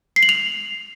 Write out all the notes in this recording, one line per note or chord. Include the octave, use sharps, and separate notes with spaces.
C7
F#7
F7